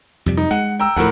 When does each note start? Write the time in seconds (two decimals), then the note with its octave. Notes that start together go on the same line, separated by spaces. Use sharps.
0.26 F2 C3 G3
0.37 D#4
0.51 G#3 F#5
0.80 G5 A#5 E6
0.96 D2 A2 F3 A#4 F#5